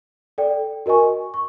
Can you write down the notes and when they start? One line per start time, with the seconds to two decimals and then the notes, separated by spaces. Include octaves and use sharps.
0.38 A4 D5 G5
0.86 F#4 A#4 D#5 G#5 C#6
1.34 C#6